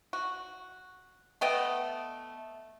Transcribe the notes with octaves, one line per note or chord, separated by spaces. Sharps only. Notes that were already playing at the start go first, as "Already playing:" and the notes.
F#4
A3 B3 D#5 G5